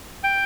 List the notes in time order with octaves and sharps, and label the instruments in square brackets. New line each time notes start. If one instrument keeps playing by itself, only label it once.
[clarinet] G5